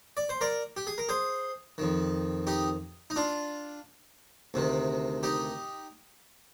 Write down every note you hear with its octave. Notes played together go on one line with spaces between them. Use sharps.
D5
C5
A#4 D5
G4
G#4
A#4
G#4 C5
F2 D#3
D#4 G4
D#4
D4 F4
D2 C3 D#3
D#4 G4